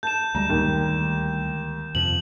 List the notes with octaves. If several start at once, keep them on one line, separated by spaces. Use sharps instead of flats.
A5 G6 E7
D2 G3 G#3 A#5
D#2
F2 C3 F3 F#7